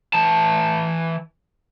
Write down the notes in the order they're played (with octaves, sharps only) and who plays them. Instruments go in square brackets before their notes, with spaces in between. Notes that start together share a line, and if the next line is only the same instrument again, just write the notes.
[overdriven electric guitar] E3 A5